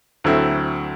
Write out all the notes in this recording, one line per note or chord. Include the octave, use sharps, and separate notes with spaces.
D2 D3 F#3 C4 E4